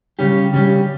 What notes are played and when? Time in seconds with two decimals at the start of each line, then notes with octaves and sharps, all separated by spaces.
0.19 C#3 G3 C#4 G4
0.53 C#3 G3 C#4 G4